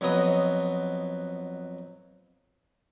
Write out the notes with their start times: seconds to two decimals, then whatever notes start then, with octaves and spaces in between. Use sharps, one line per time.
0.01 F2 F#3 B3 D#5